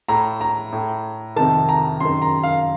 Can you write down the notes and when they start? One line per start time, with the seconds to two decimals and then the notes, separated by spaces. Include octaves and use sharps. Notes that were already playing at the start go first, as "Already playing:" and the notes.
0.09 A2 A#5
0.41 A#5
0.73 A2
1.36 F2 C3 D#3 A5
1.69 A#5
2.00 F#2 D#3 C6
2.22 A#5
2.43 F5